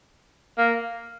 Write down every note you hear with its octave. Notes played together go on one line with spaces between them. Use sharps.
A#3